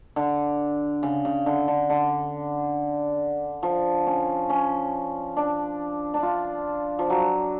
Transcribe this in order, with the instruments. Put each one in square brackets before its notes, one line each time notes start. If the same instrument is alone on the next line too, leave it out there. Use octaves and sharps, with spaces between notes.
[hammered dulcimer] D3
C#3
C#3
D3
D3
D3
F3
C#4
C#4
D4
D4
F4
F3
F#3